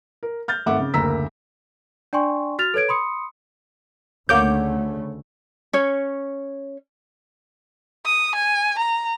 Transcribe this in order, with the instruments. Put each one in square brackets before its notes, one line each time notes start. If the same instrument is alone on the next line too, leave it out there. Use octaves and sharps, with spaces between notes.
[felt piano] A#4
F6 G6 A6
G#1 A3 E5 F#5 D6
C#3
F#1 D2 A#3 A#5 E6 B6
[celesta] D4 D5 G5 G#5 C6 C#6
F#4 F6 A6 F7
A4 B4 C#5 G#6 D7
B5 C6 D#6 C#7
[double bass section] D2 C#3 A3 [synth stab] A#3 D6 G6 [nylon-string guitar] C#5 F#5
[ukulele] C#4 C#5
[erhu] D#6
G#5
A#5